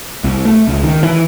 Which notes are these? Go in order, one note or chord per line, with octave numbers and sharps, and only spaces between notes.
C2
A3
C#2
D#3
E3